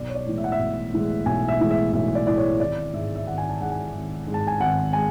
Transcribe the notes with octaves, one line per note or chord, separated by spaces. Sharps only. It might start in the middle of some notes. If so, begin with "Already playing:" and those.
Already playing: B1 D5
C#5
D5
A2 E3 G#3
E5
F#5
E5
B1
A2 E3 G#3
B1 G#5
E5
A2 E3 G#3
E5
B1 E5
D5
A2 E3 G#3 D5
C#5
G#1 D5
G#2 G#3 E5
E5
G#1 F#5
G#5
A5
G#2 G#3 F#5
G#5
G#1
G#2 G#3
A5
G#5
G#1 F#5
G#3 G#5